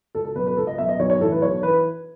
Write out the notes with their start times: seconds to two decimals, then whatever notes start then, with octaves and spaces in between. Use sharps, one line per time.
0.15 C#2 A4
0.25 A4
0.35 B2 F#3 B4
0.47 B4
0.57 C#2 A4
0.67 D#5
0.78 B2 F#3 E5
0.89 D#5
0.99 B1 C#5
1.10 C#5
1.20 A2 E3 A4
1.32 B4
1.42 B1 C#5
1.63 E3 B4